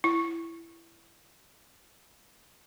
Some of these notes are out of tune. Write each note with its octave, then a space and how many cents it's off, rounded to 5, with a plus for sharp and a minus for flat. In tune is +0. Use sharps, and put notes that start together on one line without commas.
E4 +15